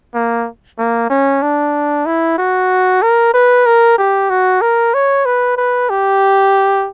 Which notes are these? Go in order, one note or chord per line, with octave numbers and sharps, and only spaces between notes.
A#3
A#3
C#4
D4
E4
F#4
A#4
B4
A#4
G4
F#4
A#4
C#5
B4
B4
G4